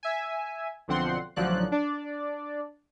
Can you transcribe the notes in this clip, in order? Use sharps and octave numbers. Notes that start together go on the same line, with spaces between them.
E5 G#5
B1 D3 F3 C4 F#5 C6
A1 D3 F3 F#3 D5 F#6
D4 D5